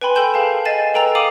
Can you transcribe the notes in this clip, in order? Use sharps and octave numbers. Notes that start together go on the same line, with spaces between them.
B4 G5 G#5 B5 C6
A4 G5 C6 G6 E7
G#4 A#4 F5 G5 A5
D#5 G#5 A6 C7 E7
A4 B4 G5 A#5 E6 F7
F5 D6 D#6 D#7 F#7